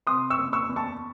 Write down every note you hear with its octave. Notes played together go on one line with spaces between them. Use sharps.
C3 C6 D#6
C#6 E6
F#1
C#6 E6
E2
A5 C#6